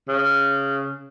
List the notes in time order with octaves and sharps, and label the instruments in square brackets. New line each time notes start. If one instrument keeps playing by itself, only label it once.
[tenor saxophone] C#3